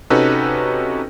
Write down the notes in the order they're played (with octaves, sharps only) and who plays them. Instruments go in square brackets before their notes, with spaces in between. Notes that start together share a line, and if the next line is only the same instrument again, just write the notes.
[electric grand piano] C3 C#4 D#4 F#4 A4 B4